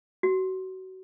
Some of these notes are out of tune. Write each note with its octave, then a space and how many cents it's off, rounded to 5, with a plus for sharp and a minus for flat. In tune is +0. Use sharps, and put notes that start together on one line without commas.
F#4 +25